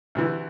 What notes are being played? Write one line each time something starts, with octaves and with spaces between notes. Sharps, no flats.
D2 C3 E3